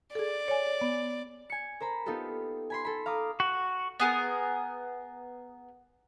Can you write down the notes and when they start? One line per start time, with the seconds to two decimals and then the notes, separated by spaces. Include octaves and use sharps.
0.15 G#4 A4 D5
0.48 C#5 G#5
0.81 B3
1.50 G#5 C#7
1.80 A#4 C5 A#5 B5
2.06 B3 D#4 F4 G4 A4
2.70 G#5 B5 C6
2.85 A4 B5
3.06 F5 A#5 D6 D#6
3.40 F#4
4.00 B3 G#4 A#4